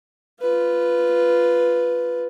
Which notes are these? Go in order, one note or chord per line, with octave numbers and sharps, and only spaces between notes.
F4 B4